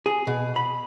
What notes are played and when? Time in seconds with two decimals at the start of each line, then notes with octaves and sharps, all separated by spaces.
0.06 G#4
0.27 B2
0.56 B5